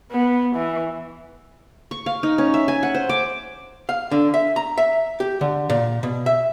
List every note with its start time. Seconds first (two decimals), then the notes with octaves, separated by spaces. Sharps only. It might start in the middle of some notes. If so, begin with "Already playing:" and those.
0.12 B3
0.55 E3
1.91 C#6
2.06 F5
2.23 D#4
2.38 C#4
2.54 E5
2.68 G#5
2.83 F#5
2.94 C5
3.09 D6
3.89 F5
4.11 D3
4.34 E5
4.56 A#5
4.78 E5
5.20 G4
5.41 D3
5.70 A#2
6.03 B2
6.26 E5